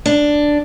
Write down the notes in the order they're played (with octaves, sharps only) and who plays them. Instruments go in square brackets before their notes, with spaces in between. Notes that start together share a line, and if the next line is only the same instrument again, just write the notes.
[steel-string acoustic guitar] D4